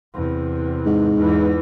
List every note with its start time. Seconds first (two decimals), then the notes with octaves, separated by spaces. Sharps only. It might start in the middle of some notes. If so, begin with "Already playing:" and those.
0.15 E2 C3
0.86 G#2
1.17 E2 E3